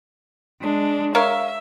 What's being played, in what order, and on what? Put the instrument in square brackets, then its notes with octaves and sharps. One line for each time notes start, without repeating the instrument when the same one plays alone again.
[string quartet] G#3 D4
[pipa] A#4 C#5 F5 [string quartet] E5